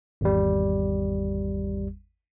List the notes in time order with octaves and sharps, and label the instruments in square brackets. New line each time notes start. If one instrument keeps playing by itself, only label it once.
[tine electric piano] G#1 E2 G3